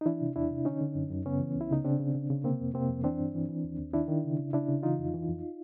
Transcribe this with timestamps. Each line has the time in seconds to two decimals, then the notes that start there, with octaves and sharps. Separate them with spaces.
0.01 D#4
0.06 E3 D4 E4
0.21 C3
0.36 E2 D4 E4
0.51 C3
0.65 D3 C#4 D#4
0.81 D3
0.95 F#2
1.11 F#2
1.25 C#3 B3 C#4
1.40 E3
1.55 C#2
1.61 E4
1.71 C#3 D#4
1.84 C#3 C4 D4
2.00 C#3
2.15 C#3
2.30 C#3
2.44 C3 A#3 C4
2.60 F2
2.74 C3 A#3 C4
2.89 F2
3.04 E3 C4 D4
3.20 G2
3.35 E3
3.49 E3
3.64 D#2
3.79 D#2
3.93 D#3 D4 E4
4.08 D#3
4.24 C#3
4.39 C#3
4.53 C#3 D4 E4
4.68 C#3
4.83 E3 D#4 F4
4.98 F2
5.14 E3
5.28 F2